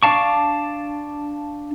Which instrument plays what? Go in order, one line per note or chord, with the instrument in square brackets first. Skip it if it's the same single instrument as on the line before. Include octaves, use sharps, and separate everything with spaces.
[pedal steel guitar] D4 D5 F5 A5 C#6